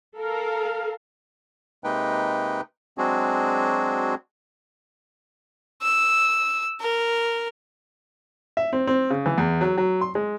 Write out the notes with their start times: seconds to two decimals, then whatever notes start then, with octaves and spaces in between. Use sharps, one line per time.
0.18 A4 A#4 F5
1.84 C3 G#3 A#3 D#4 B4 G5
2.98 F#3 G#3 C4 D4 F#4 G#4
5.82 E6
6.80 A#4
8.57 E5
8.73 C4
8.87 C4
9.10 C#3
9.26 E3
9.38 E2
9.61 F#3
9.78 F#3
10.01 C6
10.15 G#3